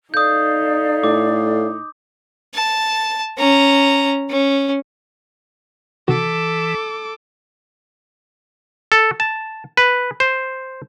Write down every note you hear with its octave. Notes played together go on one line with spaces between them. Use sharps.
D#4 A4 D5 F5 D#6 G6
A2 D6
A5
C#4 A#5
C#4
C3 D#3 E3 F#4 A4 D6
A4
A5
B4
C5